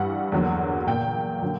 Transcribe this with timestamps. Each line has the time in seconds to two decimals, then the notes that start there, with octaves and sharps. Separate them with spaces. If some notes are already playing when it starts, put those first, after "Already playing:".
Already playing: G2 E3 G3 F#5
0.32 E2 D3 F#3 A#3
0.87 A#2 A#3 G5
1.42 D3 F#3 A#3